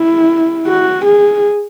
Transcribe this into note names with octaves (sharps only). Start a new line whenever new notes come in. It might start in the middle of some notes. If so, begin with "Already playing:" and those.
Already playing: E4
F#4
G#4